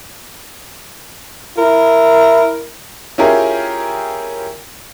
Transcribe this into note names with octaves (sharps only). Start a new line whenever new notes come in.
E4 A#4
C#4 E4 F4 G4 G#4 A#4